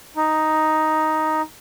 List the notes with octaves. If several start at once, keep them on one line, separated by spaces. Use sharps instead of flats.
D#4